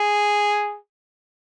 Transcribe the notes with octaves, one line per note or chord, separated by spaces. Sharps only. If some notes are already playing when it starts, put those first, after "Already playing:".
Already playing: G#4